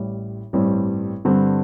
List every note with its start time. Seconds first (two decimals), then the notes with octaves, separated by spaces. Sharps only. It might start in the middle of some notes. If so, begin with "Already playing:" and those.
Already playing: A1 A2 G3
0.53 A1 G2 G3 C4
1.25 G2 D3 G3 C4